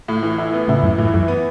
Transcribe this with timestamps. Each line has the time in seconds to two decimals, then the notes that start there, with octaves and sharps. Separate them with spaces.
0.08 A2
0.23 E3
0.38 E4
0.53 B3
0.68 A2 C#3 E4
0.83 F#2 A2 E3
0.98 F#2 A2 E3
1.14 F#2 E3
1.28 B3